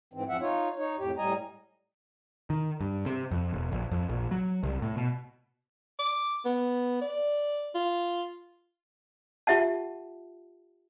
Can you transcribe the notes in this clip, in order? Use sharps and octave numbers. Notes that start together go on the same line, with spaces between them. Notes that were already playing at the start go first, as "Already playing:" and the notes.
G#2 E3 C4
F2 F3 C4 E5 F#5
D#4 F4 C#5
D#4 C#5
F2 A2 G4
A2 G3 D#5 G#5 A#5
D#3
G2
C3
F2
E1
A#1
F2
A#1
F#3
C2
A2
B2
D6
B3
D5
F4
F4 G4 E5 F#5 A5